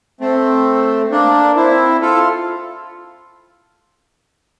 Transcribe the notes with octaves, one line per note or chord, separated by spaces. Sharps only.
A3 C4
A#3 D4
C4 E4
F4 A4